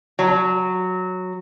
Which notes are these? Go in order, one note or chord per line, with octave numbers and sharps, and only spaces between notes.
F#3